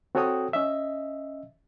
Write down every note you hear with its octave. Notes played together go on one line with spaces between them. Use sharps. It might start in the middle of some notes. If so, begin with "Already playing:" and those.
C4 F#4 A4 C#5 G5 D#6
C#4 D#5 E5